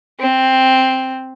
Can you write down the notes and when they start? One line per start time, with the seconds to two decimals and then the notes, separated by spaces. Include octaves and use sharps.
0.20 C4